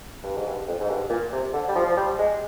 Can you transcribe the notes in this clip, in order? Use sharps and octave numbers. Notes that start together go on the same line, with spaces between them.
G2
G#2
G2
F2
G#2
G2
A#2
C3
D3
G3
F3
F3
G3
G#3